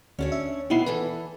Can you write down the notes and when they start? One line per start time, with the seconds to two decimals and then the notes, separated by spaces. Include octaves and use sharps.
0.19 D2 C#4 D4 F#4 C#5
0.32 E5
0.70 B2 D#3 B3 D#4 E4 C7
0.86 E2 E3 A4 B4